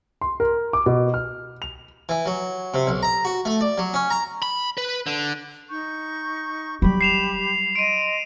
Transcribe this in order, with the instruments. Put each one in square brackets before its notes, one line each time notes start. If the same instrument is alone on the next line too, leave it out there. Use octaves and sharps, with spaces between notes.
[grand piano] C6
A#4
D6
B2
F6
F7
[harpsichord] E3
F#3
C3
B1
A#5
F#4
A3
D5
F#3
C#4
A#5
[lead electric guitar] B5
B4
D3
[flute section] D#4 C#6 G6
[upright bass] F#3 G3 [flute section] G4 B5
[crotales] C7 E7 F7
[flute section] D#5 C6 [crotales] D7 D#7